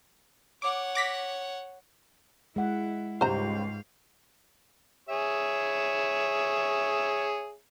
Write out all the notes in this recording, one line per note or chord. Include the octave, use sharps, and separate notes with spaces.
C#5 F#5 D6
D6 A#6 B6
G#3 E4 F#5
C#2 G#2 G3 C5 F5 A#5 G6
G#4 C#5 E5